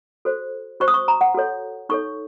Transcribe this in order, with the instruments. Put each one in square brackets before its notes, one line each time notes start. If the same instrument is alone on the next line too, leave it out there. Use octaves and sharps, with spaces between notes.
[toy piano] F#4 A4 C5
F#4 C5 C#6
D#6
C#6
A#5
F#5
F#4 A4 C#5
D#4 A4 C#5 C#6